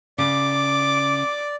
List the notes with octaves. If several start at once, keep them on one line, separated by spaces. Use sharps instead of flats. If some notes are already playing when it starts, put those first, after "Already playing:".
C#3 D5 D6